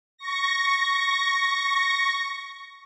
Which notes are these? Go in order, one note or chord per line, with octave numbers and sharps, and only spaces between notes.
C#6 A#6